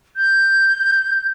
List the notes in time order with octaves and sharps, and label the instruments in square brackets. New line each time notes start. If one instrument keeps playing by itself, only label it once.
[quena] G6